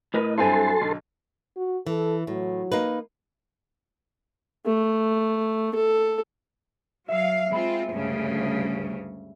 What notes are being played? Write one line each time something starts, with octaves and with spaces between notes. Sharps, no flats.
A2 A#4 B4 D#5
G2 F#3 C4 E4 A4 G#5 A5 C6
B1 D3
F#4
E3 A4
A2 F#3
A#3 D#4 B4
A3
A4
F#3 E5 F5 E6
G#3 C4 F4 B5 C#7
D2 G2 C#3